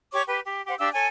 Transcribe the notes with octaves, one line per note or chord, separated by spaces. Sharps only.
G4 C#5 C#6 D6
G4 B4
G4
G4 C5 F#5
D4 G4 F5 E6
A4 C#5 G#5